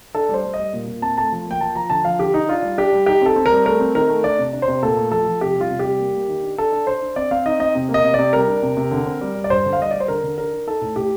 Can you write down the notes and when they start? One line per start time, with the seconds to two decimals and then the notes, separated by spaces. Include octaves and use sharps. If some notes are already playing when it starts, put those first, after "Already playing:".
0.15 D4 A4
0.29 G3 C5
0.44 G3
0.54 D#5
0.59 G3
0.73 A#2
0.87 A#2
1.02 C4 A5
1.17 A3 A5
1.32 F3
1.47 A#3 G5
1.61 F3 A5
1.75 F3 A#5
1.90 D3 A5
2.05 F3 F5
2.19 D3 G4
2.34 D#4
2.49 D4 F4
2.63 G3
2.78 D4 G4
2.93 G3
3.06 D#4 G4
3.21 C4 A4
3.36 C4
3.46 G3 A#4
3.65 A3 A#4
3.80 C4
3.95 D#3 A#4
4.09 A3
4.24 D4 D5
4.38 C3
4.53 D4
4.62 C5
4.68 C3
4.82 A#2 A4
4.97 A3
5.12 F3 A4
5.26 F3
5.41 C3 G4
5.56 G3 F4
5.70 C3
5.79 G4
5.85 G3
5.99 A#3
6.14 A#3
6.28 D#3
6.43 D4
6.58 D4 A4
6.72 D4
6.87 D4 C5
7.02 D4
7.16 C4 D5
7.31 C4 F5
7.46 D#4 D#5
7.60 C4 D#5
7.75 C3
7.89 A#3
7.94 D#5
8.04 C3
8.14 C3 D5
8.33 G3 A#4
8.48 D4
8.62 C3
8.77 C3
8.91 D3
9.06 C4
9.21 G3
9.35 G3
9.44 D5
9.50 G2 C5
9.65 D3
9.73 F5
9.79 G3 D#5
9.91 G3 D5
10.00 C5
10.08 D3 A#4
10.23 D3
10.38 D4 A#4
10.53 D4
10.67 D#4 A4
10.81 A2
10.96 A2 G4